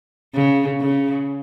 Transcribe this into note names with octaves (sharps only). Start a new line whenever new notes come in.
C#3
C#3